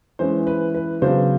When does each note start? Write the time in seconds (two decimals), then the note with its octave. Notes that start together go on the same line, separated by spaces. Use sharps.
0.19 E3 G#3 C#4 C5
0.47 B4
0.74 B4
1.02 C#3 F#3 B3 D4 C5